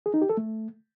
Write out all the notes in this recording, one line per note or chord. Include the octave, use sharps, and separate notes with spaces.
G#4
D#4
G4
A4
A3